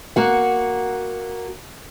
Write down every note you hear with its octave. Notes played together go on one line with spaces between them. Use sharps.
A#3 F#4 F#5